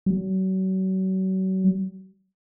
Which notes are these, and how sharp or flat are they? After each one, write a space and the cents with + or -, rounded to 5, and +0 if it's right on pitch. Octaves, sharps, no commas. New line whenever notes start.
F#3 +35